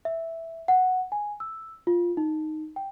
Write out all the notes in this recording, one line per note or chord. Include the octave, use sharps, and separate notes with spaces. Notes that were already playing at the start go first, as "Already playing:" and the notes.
E5
F#5
G#5
E6
F4
D#4
G5